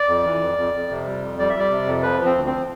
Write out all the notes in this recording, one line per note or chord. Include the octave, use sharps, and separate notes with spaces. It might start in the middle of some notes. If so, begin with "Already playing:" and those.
Already playing: D5
F2
E3
F2
F2
F2
C3
G3
F2
G3 D5
G3 E5
D5
C3
F2
F3 B4
F3
C4
D2
F3 C4